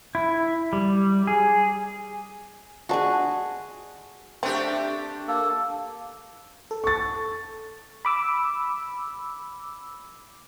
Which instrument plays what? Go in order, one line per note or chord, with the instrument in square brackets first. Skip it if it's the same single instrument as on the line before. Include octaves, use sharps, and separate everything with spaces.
[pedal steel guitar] E4
G3
G#4
[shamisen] G#3 D4 [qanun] F#4 G#4
[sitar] A3 D4 G4 [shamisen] C4
[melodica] A#3 A4
[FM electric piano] A4
[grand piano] C#6 A6
[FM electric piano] B5 D6 E6